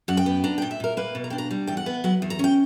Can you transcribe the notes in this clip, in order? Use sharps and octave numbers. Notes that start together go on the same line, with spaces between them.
F#2 F#5
G5
B3
D4 A#5
A#2 G5
E5
A#2 A#4
A#3 B4
B2
A#5
D4 G5
A#5
G3
E2 G5
F#5
B3
F#3 F#5
E2
A#5
C#4 G5